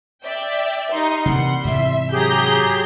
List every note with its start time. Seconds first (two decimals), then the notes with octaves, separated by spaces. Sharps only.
0.21 D5 E5 G5
0.92 G3 D#4 C6
1.26 C3 E3 A#3 F#5
1.65 G#2 C3 E3 E5
2.12 F#3 G4 G#4 A#5 G6